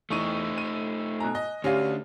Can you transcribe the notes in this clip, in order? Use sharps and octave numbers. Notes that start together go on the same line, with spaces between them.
E2 A3 D#4 C#6 D#6 D#7
D#7
B2 G#5 A#5 F#6
D#5
D2 C#4 D4 G4 F5 A#6 D#7